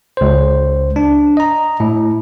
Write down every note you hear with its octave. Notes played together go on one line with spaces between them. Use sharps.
C#2 C5
D4
D#5 A#5
A2